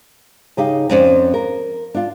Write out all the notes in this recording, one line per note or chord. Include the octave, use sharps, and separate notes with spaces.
C#3 D#4 G4 F5
F2 C4 C#4 D5
A#4
D4 F4